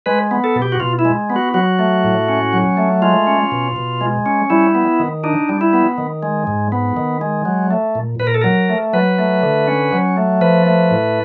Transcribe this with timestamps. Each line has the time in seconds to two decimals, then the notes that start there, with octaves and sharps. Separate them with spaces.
0.06 G#3 B4
0.31 B3
0.44 A4
0.56 B2
0.62 G4
0.72 F#4
0.80 B2 F4
0.99 E4
1.05 G#3
1.30 B3
1.36 F#4
1.54 F#3 F#4
1.79 A3
2.04 A2
2.28 C#4
2.53 F#3
2.77 A3
3.02 G#3 F4
3.27 C#4
3.52 B2
3.76 B2
4.01 G#3
4.26 C#4
4.50 G3 E4
4.75 B3
5.00 D#3
5.24 D4 D#4
5.49 G3
5.61 E4
5.73 B3
5.98 D#3
6.23 G#3
6.47 G#2
6.72 B3
6.97 D#3
7.21 G#3
7.45 F#3
7.71 A3
7.95 A#2
8.19 A#2 B4
8.27 A#4
8.34 A4
8.41 F#3 A#4
8.69 A3
8.93 F#3 B4
9.18 A3
9.43 D3
9.68 C#4
9.93 F#3
10.17 A3
10.41 F3 B4
10.66 A3
10.91 A2